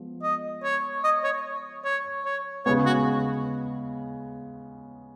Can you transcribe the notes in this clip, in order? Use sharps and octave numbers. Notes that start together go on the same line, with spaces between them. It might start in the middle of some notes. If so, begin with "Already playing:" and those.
Already playing: F3 G#3 B3
D#5
C#5
D#5
C#5
C#5
C#5
C#3 G#3 B3 C#5
F#4